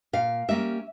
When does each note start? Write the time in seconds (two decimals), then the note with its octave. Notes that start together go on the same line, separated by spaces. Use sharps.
0.13 A#2 F5
0.48 G3 A#3 C#4 E5